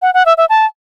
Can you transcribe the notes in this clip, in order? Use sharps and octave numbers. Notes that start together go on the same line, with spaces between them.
F#5
F#5
E5
E5
A5